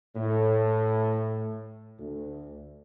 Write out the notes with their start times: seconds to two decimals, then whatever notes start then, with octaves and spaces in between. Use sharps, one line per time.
0.16 A2
1.99 D2